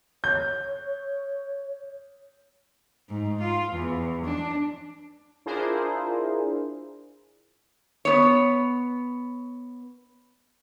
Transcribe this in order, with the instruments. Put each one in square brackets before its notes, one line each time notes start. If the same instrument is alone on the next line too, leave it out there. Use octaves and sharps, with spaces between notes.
[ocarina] C#5 [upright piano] G6
[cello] G#2
F4
E2
D4
[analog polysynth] D4 E4 F4 G#4 A#4 C5
[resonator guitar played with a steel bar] B3 C#5